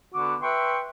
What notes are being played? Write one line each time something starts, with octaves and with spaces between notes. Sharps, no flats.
D3 B3 F#4 D6
B4 E5 G5 C6 C#6